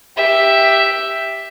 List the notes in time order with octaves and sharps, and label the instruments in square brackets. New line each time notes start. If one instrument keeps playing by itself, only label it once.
[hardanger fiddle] G4 E5